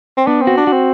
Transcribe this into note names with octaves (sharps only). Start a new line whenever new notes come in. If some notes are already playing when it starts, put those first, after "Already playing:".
C4
B3 D4
C4
F#4
D4
F#4
C4